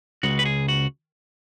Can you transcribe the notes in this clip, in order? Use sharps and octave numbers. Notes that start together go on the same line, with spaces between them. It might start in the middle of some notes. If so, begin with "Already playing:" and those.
C#2 C#3 G#3 F#4
B4
G#4
F#4